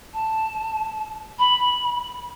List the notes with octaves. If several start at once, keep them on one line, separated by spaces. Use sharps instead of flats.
A5
B5